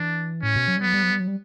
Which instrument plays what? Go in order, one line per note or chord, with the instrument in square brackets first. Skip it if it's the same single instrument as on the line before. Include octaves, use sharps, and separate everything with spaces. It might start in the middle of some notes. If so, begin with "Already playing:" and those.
Already playing: [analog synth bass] E3 [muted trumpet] D4
[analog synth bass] A2 [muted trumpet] C#4
[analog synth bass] B2
F#3
G3
[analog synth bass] F#3 [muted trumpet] B3
[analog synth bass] G3
F#3
G3
F#3
G3